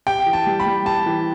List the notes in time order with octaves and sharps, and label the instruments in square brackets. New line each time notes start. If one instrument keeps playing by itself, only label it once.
[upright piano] G4 [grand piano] G5
[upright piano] E3
[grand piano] A5
[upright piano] G3
[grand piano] B5
[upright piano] G3
[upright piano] G4 [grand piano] A5
[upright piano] E3